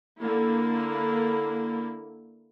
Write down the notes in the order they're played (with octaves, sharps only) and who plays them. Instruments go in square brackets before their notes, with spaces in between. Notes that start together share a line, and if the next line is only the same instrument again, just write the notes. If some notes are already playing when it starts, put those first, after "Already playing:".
[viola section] D3 A#3 E4